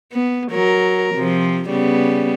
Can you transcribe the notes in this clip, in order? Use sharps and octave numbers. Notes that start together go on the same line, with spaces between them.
B3
F#3 A#4
C3 F3
C#3 G3 B3